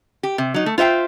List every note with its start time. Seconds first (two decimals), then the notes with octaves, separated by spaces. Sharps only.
0.23 G4
0.38 C3
0.54 F#3 D#4
0.66 A3
0.78 F4 C5 E5 F#5 G5